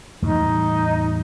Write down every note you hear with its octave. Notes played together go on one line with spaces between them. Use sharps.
E2 A2 G3 D#4